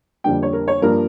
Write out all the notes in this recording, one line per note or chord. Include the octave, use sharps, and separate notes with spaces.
F2 D3 G3 A#3 D4 G5
C#5
A#4
C#5
G2 F3 A#3 D4 A#4